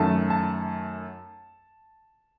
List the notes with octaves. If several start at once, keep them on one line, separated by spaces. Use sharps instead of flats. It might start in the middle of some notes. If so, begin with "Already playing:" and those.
Already playing: F#2 D#3 A3 A5
A5